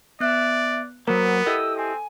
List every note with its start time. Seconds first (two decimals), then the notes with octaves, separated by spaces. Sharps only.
0.20 B3 D5 E5 F#6
1.08 F#3 A#3 B3 A#4 C5
1.46 E4 G4 A4 D#5 E6
1.76 C4 G#5